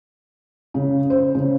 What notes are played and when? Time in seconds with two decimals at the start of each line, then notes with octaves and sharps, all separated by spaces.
0.74 C#3
1.10 C5
1.35 C#3